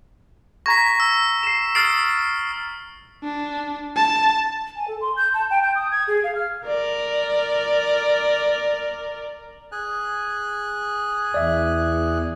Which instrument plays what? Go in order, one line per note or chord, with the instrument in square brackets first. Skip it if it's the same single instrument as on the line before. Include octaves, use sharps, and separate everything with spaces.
[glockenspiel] A#5 G#6 A#6 [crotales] C#6 B6
[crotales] E6
[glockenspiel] C7 E7
[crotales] D#6 C7 [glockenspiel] F6 A6 D7
[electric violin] D4
A5
[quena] G#5
A4
C6
G6
A5
G5
G6
D#6
G#6
G#4
F5
F6
[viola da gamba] A#4 D5
[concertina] G#4 G#5 F#6
[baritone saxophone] E2 [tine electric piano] D5 E5